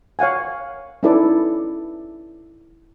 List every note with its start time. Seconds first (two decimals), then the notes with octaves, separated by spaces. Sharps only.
0.19 C#5 F5 F#5 G#5
1.03 C#4 D#4 E4 A4 B4 D5